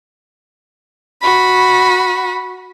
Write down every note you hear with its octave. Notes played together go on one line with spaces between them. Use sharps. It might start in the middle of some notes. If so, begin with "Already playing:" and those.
F#4 B5